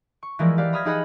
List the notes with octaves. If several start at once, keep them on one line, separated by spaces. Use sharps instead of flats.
C#6
E3 F3 G#3 E4 A#4 D5
G4 B4 D5 F5
A#5 B5 D#6 F6 G#6 B6
D#4 G4 G#4 D#5 F#5 B5